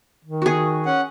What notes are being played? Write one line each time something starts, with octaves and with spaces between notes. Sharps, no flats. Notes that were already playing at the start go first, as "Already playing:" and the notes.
D#3
F#4 G#4
C#4 F#5